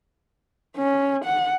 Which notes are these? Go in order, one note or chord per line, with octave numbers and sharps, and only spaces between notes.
C#4
F#5